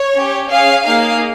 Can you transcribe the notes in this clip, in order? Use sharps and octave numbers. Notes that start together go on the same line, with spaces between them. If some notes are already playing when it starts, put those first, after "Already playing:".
Already playing: C#5
C#4 G4
C#4 G#4 F5
A#3 D#4 G#4 F5